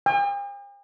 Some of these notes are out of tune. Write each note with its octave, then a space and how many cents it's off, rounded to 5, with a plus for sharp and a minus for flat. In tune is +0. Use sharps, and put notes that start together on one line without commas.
G5 +45